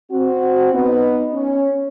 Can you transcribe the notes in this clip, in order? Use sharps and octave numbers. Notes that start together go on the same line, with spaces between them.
C4 F#4
B3 D#4
C#4